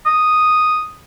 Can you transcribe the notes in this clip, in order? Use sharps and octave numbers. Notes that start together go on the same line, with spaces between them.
D#6